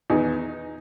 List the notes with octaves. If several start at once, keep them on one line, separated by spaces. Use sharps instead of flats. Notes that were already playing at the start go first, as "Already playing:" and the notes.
E2 D#3 D#4